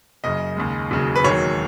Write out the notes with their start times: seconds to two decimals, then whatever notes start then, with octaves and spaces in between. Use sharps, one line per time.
0.23 F#1 F#2 C#3 D#5
0.57 D#2 C#3 G#3
0.91 E1 D#2 C#3 F#3
1.16 B4
1.24 E1 D#2 D#3 F#3 C#5